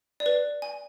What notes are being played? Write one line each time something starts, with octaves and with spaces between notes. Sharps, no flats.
D5
B4
G#5